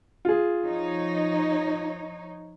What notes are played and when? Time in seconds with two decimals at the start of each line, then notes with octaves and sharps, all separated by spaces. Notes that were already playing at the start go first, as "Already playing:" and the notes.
0.25 F4 G#4
0.66 F3 D#4 C#5